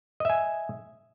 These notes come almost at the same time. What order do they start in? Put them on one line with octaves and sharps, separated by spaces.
D#5 E5 G#5